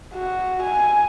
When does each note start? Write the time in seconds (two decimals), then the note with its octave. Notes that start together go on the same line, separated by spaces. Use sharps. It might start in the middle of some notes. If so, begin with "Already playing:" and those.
0.15 F#4
0.63 G#5